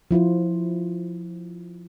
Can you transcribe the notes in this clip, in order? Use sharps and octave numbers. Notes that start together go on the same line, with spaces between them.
F3 E4 F4 C5